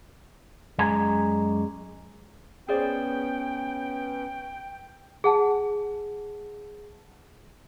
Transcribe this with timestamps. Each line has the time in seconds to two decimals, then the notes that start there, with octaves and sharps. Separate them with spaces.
0.79 F#2 G#3 D5 G#5 A#5
2.68 B3 C#4 G#4 C5 D5 G5
5.24 G#4 F#5 A5